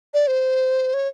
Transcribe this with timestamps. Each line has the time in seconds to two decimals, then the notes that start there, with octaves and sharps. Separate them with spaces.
0.14 D5
0.27 C5
0.94 C#5